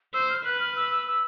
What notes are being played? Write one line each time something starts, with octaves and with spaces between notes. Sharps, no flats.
C5 E6
F6
B4 F#6
F6
E6
E6
E6